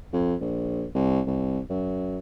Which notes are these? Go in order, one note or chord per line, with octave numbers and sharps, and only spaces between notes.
F2
A#1
C2
C2
F#2